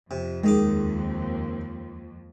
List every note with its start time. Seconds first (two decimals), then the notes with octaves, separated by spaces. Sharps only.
0.11 F2 C3
0.44 D#2 D#3 G#3 C4 D#4 D6